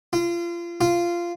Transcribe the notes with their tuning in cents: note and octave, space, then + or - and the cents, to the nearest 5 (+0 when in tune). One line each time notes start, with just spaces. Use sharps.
F4 -30
F4 -15